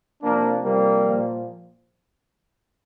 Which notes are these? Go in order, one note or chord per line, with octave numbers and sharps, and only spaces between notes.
C3 F3 A#3 D4
C3 F3 G3 A#3
A#2 F3